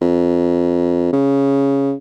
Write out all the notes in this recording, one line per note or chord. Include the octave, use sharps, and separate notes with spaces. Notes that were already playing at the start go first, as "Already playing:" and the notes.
F2
C#3